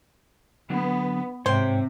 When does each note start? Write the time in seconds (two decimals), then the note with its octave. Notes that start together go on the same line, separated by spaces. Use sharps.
0.70 D3 F#3 B3
1.46 G#2 C3 C5 C#5 F#5 G5